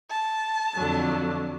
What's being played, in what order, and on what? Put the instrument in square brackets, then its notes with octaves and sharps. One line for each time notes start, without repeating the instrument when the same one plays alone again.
[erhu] A5
[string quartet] F2 D3 F#3